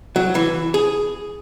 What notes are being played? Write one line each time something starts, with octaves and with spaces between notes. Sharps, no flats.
F#3
E3
G#4